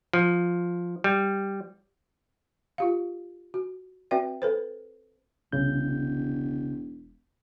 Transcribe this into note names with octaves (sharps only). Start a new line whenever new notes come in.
F3
G3
F4 G4 F5
F#4
C4 F#4 B4 D5 E5 G5
A4 B4 C5
E1 C2 C#3 G6